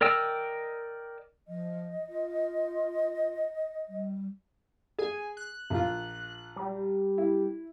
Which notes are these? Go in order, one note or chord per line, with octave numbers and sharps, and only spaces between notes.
A#4 D5 D#5 G5 E6
F3 D#5
F4
G3
G#4 G#5
F#6
A#1 F4
G3
E4